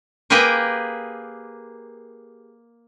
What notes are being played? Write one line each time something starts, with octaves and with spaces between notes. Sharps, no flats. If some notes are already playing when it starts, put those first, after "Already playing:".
A#3 G4 G#4 A#4 B4 G5